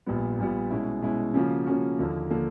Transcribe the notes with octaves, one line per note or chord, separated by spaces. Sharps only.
A#1 A#2 G3 B3
A#1 A#2 G3 B3
B2 G#3 C#4 E4
B2 G#3 C#4 E4
C#3 F3 A#3 C#4 F#4
C#3 F3 A#3 C#4 F#4
D#2 D3 F3 A#3
D3 F3 A#3